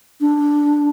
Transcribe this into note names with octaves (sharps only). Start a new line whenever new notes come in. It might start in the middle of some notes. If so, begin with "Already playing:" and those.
D4